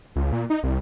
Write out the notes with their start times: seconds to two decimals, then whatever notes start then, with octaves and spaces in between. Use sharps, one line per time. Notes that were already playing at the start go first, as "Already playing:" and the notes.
0.16 C#2
0.33 A#2
0.50 D#4
0.63 C2